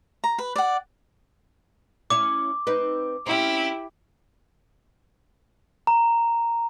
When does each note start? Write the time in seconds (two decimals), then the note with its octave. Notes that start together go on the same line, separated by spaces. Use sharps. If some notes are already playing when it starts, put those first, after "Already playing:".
0.24 A#5
0.39 B4
0.56 D5 F#5
2.10 C#4 E4 C#5 D6
2.67 C4 D#4 B4
3.26 C4 C#4 E4 G4
5.87 A#5